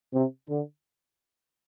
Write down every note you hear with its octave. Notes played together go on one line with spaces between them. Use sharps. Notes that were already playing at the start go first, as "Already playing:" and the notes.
C3
D3